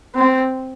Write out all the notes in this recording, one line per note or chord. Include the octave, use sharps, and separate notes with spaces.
C4